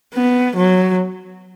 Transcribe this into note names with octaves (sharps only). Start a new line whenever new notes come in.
B3
F#3